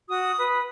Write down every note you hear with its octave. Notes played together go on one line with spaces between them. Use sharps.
F#4 D#6
B4